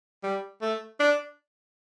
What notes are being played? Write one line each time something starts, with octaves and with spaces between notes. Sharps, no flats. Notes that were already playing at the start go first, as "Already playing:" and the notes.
G3
A3
D4